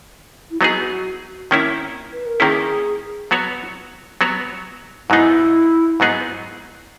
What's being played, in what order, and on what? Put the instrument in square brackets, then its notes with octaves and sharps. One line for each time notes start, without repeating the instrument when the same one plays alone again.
[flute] E4
[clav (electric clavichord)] F#3 B3 D#4 G#4 [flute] F#4
[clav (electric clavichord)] D#3 A#3 C#4 E4
[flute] B4
A#4
[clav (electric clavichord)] D#3 A#3 C#4 E4 [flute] G#4
[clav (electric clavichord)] F#3 B3 F#4 C#5
F#3 B3 F#4 C#5
[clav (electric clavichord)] G#2 F#3 B3 D#4 G#4 [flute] E4
[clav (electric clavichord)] G#2 F#3 B3 D#4 G#4